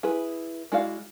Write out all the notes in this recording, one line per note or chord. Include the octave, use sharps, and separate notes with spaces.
E4 G#4 B4
G#3 E4 F#4 D5 F5